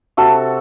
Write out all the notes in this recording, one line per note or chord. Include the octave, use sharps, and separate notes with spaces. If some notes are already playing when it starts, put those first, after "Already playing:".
C3 F#4 A4